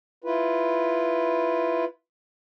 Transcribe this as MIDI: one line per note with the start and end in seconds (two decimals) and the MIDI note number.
0.24 1.85 64
0.24 1.85 65
0.24 1.85 71